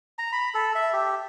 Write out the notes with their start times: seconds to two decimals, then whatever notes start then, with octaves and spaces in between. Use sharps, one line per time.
0.19 A#5
0.33 B5
0.54 A4
0.75 E5
0.93 G4